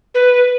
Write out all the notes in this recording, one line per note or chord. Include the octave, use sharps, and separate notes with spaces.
B4